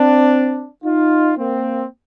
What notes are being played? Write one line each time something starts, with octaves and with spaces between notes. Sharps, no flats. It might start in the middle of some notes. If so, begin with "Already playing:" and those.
Already playing: C4 D4
D#4 F4
A#3 C4